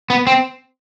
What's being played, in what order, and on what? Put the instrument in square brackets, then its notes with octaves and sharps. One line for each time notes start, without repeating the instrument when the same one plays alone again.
[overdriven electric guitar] B3
C4